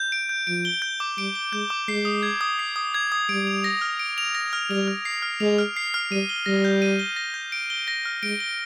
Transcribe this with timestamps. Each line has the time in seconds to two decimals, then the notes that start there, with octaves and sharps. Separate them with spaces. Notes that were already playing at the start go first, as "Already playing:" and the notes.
Already playing: G6
0.12 D7
0.29 G6
0.47 F3 D7
0.65 G7
0.82 G6
1.00 D6
1.18 G3 D7
1.35 G7
1.53 G#3 G6
1.70 D6
1.88 G#3 C7
2.05 D#6
2.23 G#6
2.41 D#6
2.59 C7
2.76 D#6
2.94 G#6
3.12 D#6
3.29 G3 D7
3.47 F7
3.64 A#6
3.81 F6
3.99 D7
4.18 F7
4.35 A#6
4.53 F6
4.70 G3 F7
4.88 F6
5.05 C7
5.22 F6
5.40 G#3 F7
5.58 F6
5.77 C7
5.94 F6
6.11 G3 D#7
6.29 G7
6.46 G3 A#6
6.64 G6
6.82 D#7
6.99 G7
7.16 A#6
7.34 G6
7.52 D7
7.70 G7
7.88 A#6
8.05 F6
8.23 G#3 D7
8.40 G7